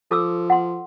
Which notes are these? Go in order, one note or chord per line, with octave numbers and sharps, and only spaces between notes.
F3 A4 D6 E6
F#5 C6